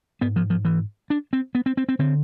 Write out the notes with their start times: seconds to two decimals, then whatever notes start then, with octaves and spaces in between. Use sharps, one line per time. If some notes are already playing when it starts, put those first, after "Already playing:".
0.21 G#2 B3
0.36 F3
0.50 F3
0.65 E3
1.10 D4
1.33 C4
1.55 B3
1.66 C4
1.77 C4
1.89 C4
1.99 D3 C4